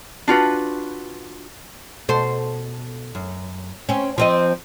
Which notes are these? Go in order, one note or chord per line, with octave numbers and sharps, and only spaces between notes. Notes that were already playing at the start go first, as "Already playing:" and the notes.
D4 F4 F#4 B4
B2 A4 C5
F#2
C4 C#4
F3 C4 D#5